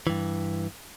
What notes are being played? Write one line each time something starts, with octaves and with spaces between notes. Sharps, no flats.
G2 E3